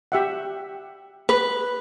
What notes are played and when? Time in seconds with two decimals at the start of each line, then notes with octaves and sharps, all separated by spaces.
0.12 G4 E5 F#5
1.29 B4